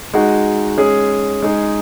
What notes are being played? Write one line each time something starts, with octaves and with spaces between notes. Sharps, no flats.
G#3 D#4 F#4
G#3 C#4 G#4
G#3 D#4 G#4